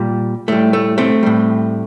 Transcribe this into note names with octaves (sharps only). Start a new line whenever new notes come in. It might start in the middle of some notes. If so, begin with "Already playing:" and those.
Already playing: A#2 G3
A2 G3 A3
A3
A3 C4
A2 G3